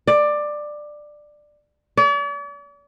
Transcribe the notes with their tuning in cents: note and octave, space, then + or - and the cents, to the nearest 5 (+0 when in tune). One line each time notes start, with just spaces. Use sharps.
D5 +15
D5 -45